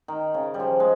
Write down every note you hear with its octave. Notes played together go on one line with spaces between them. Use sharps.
D#3
C#3
G3
F3
G#3